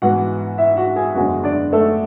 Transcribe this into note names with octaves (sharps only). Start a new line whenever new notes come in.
G#2 E3 B3 F#4 F#5
E4 E5
F#4 F#5
G#4 G#5
F#1 E2 D3 G#3 C#4 F#4 F#5
D4 D5
A3 A4